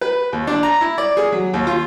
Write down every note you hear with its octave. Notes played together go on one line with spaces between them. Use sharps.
B4
D#2
D4
A#5
E4
D5
G#4
F#3
D#2
F4